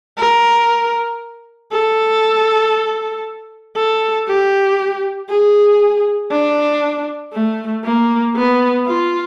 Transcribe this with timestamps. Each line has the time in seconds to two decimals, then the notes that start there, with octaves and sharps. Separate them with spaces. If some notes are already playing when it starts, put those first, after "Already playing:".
0.18 A#4
1.72 A4
3.76 A4
4.27 G4
5.29 G#4
6.31 D4
7.33 A3
7.84 A#3
8.35 B3
8.86 F4